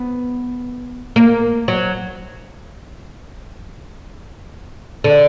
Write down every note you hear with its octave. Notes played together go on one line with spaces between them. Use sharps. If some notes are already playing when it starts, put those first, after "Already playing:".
Already playing: B3
A#3
F#3
D3